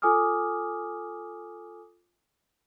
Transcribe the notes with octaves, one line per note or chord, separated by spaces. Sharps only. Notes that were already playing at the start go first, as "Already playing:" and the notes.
F4 A4 G#5 D6 D#6 F6